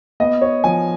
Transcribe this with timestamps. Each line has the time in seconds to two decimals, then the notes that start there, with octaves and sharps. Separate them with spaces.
0.20 B3 D#5
0.42 C#5
0.64 F3 G#5